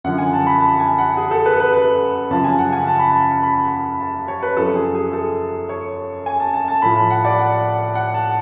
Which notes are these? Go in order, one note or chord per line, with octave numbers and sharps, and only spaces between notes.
F#2 D3 F3 F#5
G#5
A5
B5
A5
G#5
F#5
G#4
A4
B4
A4
B4
B4
F#2 C#3 F3 A5
G#5
F#5
G#5
A5
B5
A5
B5
A5
C#5
B4
F#2 F3 A4
G#4
G#4
A4
C#5
G#5
A5
A5
A5
A2 F3 B5
A5
F#5
D5
F#5
F#5
A5